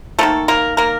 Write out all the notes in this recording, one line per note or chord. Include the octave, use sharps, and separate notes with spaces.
D#3 G3 A3 A#3 A4
A#3 A#4
A#3 A#4